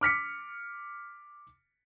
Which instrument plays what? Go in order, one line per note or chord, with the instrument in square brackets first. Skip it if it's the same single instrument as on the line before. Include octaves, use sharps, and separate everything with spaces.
[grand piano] D6 F6 B6 C#7